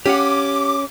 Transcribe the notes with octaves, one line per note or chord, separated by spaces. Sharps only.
C#4 G4 F5 F#5 D6